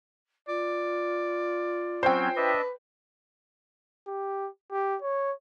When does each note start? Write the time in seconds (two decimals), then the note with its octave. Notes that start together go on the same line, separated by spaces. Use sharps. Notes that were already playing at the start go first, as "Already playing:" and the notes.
0.48 F4 D5
2.03 F#3 C4 C#4 C5 G5
2.36 D4 B4 D#5 E5
4.08 G4
4.72 G4
5.02 C#5